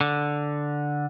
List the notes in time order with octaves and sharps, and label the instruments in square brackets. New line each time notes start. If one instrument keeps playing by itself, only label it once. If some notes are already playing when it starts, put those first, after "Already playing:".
[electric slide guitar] D3